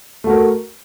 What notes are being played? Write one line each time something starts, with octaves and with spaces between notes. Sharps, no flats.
A3 F#4 A#4